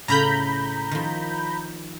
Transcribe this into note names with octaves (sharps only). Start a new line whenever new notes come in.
A2 C#3 A#5 B5 G6
D#3 F3